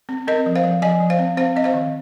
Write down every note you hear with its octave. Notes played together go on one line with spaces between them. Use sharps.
C4
C4 A#4 D#5
F3
C5 F5
F3
F3 D#5 G#5
F3
C5 F5
C4
C4 C5 F5
C4 D#5
C5 F5
D#3